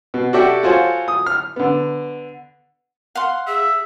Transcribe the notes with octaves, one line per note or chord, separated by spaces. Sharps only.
B2
F#4 G4 A4 D5 E5 G5
F4 F#4 A4 C5 C#5 G#5
D#6
F6
D3 B3
F5 F#5 C6
G#4 E5